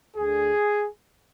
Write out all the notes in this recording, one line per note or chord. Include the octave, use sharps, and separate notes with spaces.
D2 D3 G#4